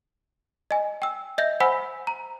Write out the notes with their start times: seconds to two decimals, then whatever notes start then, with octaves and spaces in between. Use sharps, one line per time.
0.71 D#5 G#5
1.02 G5 E6
1.38 D#5 E5 G6 A#6
1.60 C5 F#5 G#5 B5 E6 B6
2.07 A#5